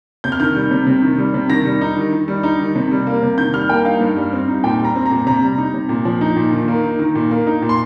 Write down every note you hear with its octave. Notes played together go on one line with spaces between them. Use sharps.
C3 G6
F6
D#3 G6
G3
C3
C3
D#3
G3
C3
D#3 A#6
G3
D#4
D#3
D#3
G3
D#4
D#3
C3
G3
A#3
C3
D#3 G6
G3 F6
A#3 G5
D#4 F5
G2
G3
C4
D#4
A#2 G5
G3 A#5
C4
A#5
A#2
C3 A#5
G3
D#4
C3
A#2
F3
D#4
A#2
D#3
A#3
D#4
D#3
A#2
A#3
D#4
A#2
C6